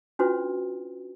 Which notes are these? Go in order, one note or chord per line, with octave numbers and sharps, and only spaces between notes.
C#4 D4 F4 F#4 B4 C5